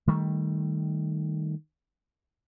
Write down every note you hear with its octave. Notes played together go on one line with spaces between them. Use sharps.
D#3 G3 A3